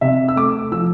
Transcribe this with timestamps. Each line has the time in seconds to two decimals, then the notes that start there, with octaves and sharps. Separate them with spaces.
0.01 C3 E5
0.28 E6
0.36 A3 D6
0.72 F3 E6